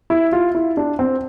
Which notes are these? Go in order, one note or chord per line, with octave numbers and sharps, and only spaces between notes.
E4
F4
E4
D4
C4